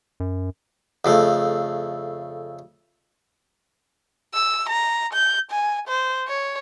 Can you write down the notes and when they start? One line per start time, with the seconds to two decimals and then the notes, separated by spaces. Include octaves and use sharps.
0.20 F#2
1.05 F2 C#3 A3
4.34 E6
4.69 A#5
5.13 G6
5.51 G#5
5.88 C5
6.28 C#5